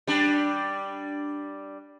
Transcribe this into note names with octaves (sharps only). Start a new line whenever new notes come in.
G3 D4